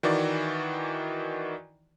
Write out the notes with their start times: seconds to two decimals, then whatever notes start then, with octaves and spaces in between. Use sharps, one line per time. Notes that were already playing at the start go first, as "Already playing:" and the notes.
0.03 D#3 E3 F#4 D5